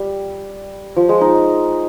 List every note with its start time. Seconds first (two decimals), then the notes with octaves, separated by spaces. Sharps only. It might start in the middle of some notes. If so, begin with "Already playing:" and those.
Already playing: G3
0.96 F3
1.09 G#3
1.21 D#4